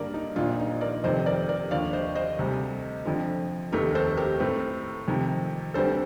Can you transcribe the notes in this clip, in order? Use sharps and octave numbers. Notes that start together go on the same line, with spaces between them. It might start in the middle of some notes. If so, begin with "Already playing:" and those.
Already playing: G2 D3 G3 A#3 A#4 D5
D#4
A#1 A#2 F3 A#3 D4 F4
D#4
A#4 D5
F1 F2 C3 D#3 C5 D#5
A#4 D5
A#4 D5
D#2 D3 F3 D5 F5
C5 D#5
C5 D#5
D2 C3 G3
F2 D3 F3
F1 D#2 D#3 A3 G4 A#4
A4 C5
G4 A#4
A2 A3 C4
F2 C3 D#3
D2 D3 G3 C4 A4 C5